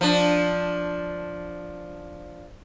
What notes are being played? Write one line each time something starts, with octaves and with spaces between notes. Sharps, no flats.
F3 D4